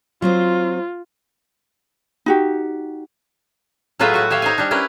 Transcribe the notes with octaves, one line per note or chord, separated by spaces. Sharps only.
F#3 C4 F4 C5
D#4 F#4 G4
A2 F#3 G#3 F4 B4 E5
F#4 F#5
G4 C#5 E5 F5
D#4 C5 G#5
G3 D4
C#4 E4 G4 A#4 B4